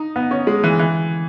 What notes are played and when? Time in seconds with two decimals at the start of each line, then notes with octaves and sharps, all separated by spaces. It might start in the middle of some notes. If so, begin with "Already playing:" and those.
Already playing: D#4
0.16 B3
0.31 C#4
0.47 G#3
0.64 E3
0.79 E3